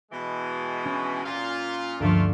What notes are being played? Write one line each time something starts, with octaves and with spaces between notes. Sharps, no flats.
B2 E3 G#3
C#4
A#2 F4 F5 F6
D2 G2 F3 A3 A#3 F4